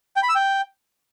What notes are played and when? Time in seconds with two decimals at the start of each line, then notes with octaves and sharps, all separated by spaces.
0.16 G5
0.23 B5
0.29 E6
0.35 G5